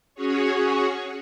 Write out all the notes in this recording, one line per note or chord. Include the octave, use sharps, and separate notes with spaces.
C#4 F#4 G#4 C#5